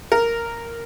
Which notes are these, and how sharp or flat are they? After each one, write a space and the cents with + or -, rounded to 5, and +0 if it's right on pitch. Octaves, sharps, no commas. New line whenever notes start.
A#4 -5